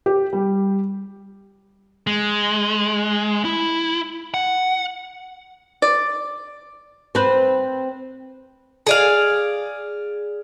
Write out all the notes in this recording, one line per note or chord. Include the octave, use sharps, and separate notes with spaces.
G4
G3
G#3
E4
F#5
D5
C4 B4
G#4 D5 F5